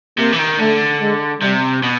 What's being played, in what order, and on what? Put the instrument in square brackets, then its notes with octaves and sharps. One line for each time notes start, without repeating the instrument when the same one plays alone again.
[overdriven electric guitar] C3 [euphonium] A#3
[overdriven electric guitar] E3
D#3
[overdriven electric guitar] D3 [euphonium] A3
[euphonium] G#3
[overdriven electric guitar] C3 [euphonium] G3
[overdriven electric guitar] B2